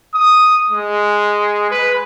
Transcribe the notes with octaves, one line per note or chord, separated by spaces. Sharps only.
D#6
G#3
B4